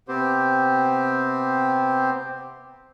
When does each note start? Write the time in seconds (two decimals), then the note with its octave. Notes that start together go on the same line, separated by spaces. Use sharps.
0.08 C3 B3 C4 G4 C5